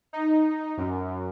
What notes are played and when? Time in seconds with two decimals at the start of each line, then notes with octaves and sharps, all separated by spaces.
0.13 D#4
0.77 F#2